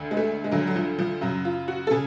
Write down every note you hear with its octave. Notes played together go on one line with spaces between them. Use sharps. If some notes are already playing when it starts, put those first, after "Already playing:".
Already playing: D2 D3
G#3
A3
G#3
D2 D3 F#3
F#3
F3
F3
F#2 C#3 F#3
F4
F#4
A4
C#3 G#4